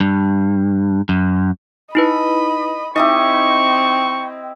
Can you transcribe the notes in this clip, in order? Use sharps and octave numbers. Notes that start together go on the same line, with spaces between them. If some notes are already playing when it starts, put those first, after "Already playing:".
G2
F#2
D#4 E4 B4 D#5 B5
C4 D#4 E4 G4 D#5 C#6